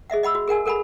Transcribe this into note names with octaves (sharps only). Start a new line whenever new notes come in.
G#4 D#5 E5 F#5
D#5 F#5 B5 E6
F#4
G#4 A#4 F#5 G#5
A4 A#4 F#5 G#5 B5